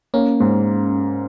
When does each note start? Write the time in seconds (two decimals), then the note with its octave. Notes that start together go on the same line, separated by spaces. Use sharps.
0.14 A#3 C#4
0.40 G#2